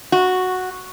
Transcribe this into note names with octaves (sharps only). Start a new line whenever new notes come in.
F#4